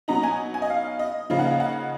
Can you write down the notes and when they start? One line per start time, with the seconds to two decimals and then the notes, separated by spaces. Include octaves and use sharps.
0.08 B2 F#3 B3 D#4 A#5
0.23 G#5
0.54 G#5
0.62 D#5
0.70 F5
0.99 D#5
1.30 C#3 F3 A#3 D#4 F5
1.39 F#5
1.47 F5
1.60 F#5